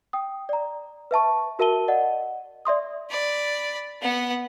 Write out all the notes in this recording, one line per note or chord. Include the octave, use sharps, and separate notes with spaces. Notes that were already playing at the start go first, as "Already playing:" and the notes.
G5 D#6
D5 A#5
B4 E5 A5 C#6
F#4 A#4 E5 A5 D#7 G7
D5 D#5 F#5
D5 E5 C6 D#6
D5 B5
B3 F#5